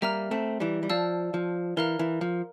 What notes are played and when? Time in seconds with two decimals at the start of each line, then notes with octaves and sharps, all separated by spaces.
0.02 G3 A#3 E5 A#5 F6
0.31 A3 C4
0.60 E3 G3
0.83 G3
0.90 F3 D5 F5 A5 E6
1.34 F3
1.77 E3 A#4 F5 A#5 F6
1.99 E3
2.21 F3